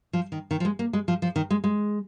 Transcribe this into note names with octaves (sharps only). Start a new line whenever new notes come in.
F3
D#3
D#3
F3
G#3
A#3
G#3
F3
F3
D#3
G#3
G#3